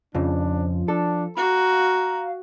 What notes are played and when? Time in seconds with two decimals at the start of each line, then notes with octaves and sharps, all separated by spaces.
0.15 F2 C#3 F3 D4
0.88 D4 A4
1.37 F#4 F5 A#5